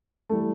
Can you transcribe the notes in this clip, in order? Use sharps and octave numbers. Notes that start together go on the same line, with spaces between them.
E3 G3 A3